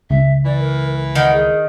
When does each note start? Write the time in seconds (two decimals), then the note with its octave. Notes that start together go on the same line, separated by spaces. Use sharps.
0.10 C#2 E5
0.45 E3 D5
0.59 A#4
1.15 D#3 F#5
1.33 G#4